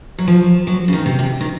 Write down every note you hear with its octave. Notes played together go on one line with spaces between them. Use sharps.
F#3
F3
F#3
C#3
D#3
C3
C3
D#3